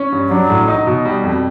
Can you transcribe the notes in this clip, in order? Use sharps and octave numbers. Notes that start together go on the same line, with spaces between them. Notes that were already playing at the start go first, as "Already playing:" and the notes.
Already playing: C#4
G2
F#3 D4
A2
D#4
B2
G3
F2